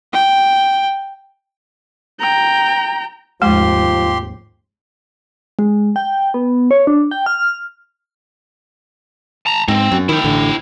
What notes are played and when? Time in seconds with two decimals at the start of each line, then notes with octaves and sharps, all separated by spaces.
0.13 G5
2.20 G5 A#5
3.42 F1 D#2 G#2 F3 G#3 G4 C6
5.59 G#3
5.96 G5
6.34 B3
6.71 C#5
6.87 D4
7.11 G5
7.26 F6
9.46 A5 A#5
9.68 G#2 C4
9.92 F#2
10.09 D#3 E4 G5
10.24 A1 D3